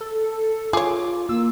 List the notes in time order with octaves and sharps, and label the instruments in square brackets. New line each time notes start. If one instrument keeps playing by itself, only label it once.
[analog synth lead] A4
[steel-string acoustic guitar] F4 [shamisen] G#4 C#5 [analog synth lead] D6
[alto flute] A#3 [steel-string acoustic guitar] F4 [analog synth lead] E6